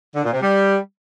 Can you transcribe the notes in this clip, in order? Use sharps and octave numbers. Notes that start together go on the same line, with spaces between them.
D3
A#2
C3
G3